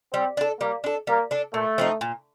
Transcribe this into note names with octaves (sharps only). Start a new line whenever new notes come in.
G3 C4
D4 A4
G3 A#3
D4 A4
G3 A#3
D4 A4
A#2 A3
F3 C4 D#4
A#2